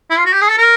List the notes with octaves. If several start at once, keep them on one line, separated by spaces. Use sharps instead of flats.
E4
F4
F#4
G4
G#4
A4
A#4